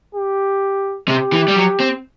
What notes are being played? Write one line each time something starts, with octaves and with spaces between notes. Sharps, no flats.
G4
C3 G4
E3
G3
F#3
C4